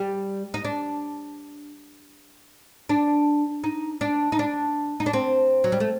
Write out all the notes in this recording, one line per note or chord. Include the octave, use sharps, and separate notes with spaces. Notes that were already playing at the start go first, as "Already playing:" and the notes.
Already playing: G3
D#4
D4
D4
D#4
D4
D#4
D4
D#4
D4
C4
F#3
G3
A3